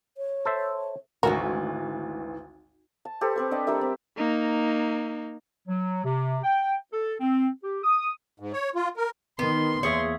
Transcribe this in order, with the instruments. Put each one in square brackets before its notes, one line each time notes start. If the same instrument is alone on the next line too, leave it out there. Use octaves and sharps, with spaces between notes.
[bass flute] C#5
[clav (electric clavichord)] A4 C5 E5
[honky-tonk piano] G#1 D2 [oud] E3 C#4 F#4 [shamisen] A#4
[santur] A5
G4 A4 B4 C5
C4 B4 C#6
D4 D#5 G5 A5
G3 D4 A#4 E5
C4
[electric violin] A#3 D#4
[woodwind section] F#3
C3
G5
A4
C4
G4
D#6
[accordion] G#2
C#5
F4
A#4
[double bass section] D#3 [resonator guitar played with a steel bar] B3 [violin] C6
[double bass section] E2 [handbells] A#3 G#4 E5 [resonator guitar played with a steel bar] C#5